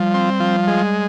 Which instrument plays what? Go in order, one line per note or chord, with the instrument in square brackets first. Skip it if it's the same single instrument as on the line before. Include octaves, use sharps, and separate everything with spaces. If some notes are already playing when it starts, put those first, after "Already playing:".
Already playing: [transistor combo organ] F3 [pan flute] G3
[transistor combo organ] C4
F3
G#3